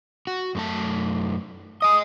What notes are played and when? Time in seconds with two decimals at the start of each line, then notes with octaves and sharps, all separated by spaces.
0.27 F#4
0.55 F#2 A3 A5
1.82 D#5 G#5 D#6